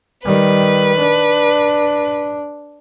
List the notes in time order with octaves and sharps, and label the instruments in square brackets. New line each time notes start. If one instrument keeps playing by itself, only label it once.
[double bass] D#3 G3 [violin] B4
[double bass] D4